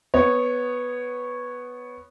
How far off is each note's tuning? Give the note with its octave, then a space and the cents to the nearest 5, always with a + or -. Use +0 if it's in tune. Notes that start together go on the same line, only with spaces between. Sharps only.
B3 +0 C#5 -5